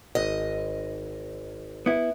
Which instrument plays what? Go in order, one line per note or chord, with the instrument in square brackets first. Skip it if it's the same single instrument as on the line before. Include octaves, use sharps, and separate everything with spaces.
[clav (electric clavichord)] G#1 [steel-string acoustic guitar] D#5
[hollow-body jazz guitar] B3 E4